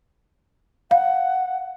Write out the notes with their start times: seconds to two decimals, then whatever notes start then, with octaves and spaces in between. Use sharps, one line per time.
0.91 F5 F#5